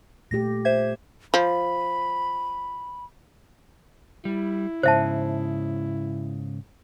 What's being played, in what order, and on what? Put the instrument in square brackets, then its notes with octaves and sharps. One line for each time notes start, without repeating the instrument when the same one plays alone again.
[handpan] A#2 A3 G4 [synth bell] A#6
[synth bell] C5 E5 G#6
[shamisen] F3 [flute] B5
[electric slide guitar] G3 [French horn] E4
[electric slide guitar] G#2 C#3 [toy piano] C5 E5 A5